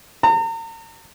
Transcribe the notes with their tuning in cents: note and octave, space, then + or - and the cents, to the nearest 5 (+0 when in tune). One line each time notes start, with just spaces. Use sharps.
A#5 -40